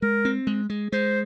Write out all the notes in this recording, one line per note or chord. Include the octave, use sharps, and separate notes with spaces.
G#3 A#4
C4
G#3
G#3
G#3 C5